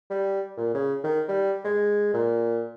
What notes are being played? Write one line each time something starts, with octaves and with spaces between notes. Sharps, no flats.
G3
A#2
C#3
D#3
G3
G#3
A#2